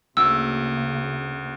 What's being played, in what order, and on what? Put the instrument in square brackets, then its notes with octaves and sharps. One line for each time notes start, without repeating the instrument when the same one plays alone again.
[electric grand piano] D2 [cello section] C#3 A#3 [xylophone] E6